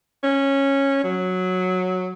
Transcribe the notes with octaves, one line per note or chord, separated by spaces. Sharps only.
C#4
F#3